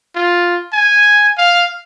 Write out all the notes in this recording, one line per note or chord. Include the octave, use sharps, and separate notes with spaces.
F4
G#5
F5